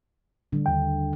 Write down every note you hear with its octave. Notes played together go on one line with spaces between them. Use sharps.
D3 G3 D4
D#2 G5